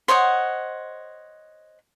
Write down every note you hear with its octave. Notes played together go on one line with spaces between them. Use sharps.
C5 C#5 D#5 F#5